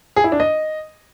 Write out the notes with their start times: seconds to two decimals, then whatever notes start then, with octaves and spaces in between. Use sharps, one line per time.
0.16 G#4
0.24 E4
0.32 D4
0.40 D#5